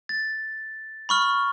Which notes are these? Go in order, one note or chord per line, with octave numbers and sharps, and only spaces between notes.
A6
B5 C#6 F6